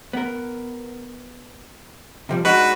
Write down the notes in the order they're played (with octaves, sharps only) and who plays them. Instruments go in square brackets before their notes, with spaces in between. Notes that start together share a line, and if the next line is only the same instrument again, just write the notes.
[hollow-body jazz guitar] B3 A#4
C3 F3 G3
[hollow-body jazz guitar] G#3 D4 D#4 [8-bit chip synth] F#4 B4